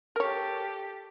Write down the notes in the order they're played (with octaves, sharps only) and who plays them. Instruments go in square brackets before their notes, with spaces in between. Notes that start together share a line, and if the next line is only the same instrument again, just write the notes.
[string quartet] G4 A4 [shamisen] A#4 C#5